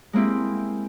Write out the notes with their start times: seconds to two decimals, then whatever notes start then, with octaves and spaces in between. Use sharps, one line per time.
0.13 G#3 A#3 C4 E4 G4